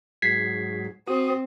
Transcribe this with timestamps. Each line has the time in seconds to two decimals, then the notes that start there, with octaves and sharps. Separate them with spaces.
0.22 G#2 F#3 G#6 B6 C7
1.08 C4 F#4 D#6